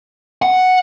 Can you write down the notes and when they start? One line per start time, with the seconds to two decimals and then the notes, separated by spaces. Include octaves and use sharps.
0.42 F#5